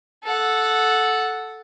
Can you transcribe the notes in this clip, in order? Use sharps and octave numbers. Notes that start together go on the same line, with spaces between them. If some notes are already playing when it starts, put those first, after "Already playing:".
A4 F#5